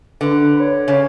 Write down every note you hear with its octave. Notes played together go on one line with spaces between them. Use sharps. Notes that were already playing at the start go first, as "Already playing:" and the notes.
D3 B4
C#5
C#3